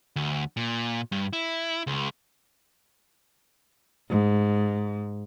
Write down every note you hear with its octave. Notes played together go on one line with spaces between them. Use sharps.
D2
A#2
G2
E4
C#2
G#2